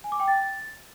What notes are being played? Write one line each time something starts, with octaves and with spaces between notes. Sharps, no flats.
G#5
D6
G5
A6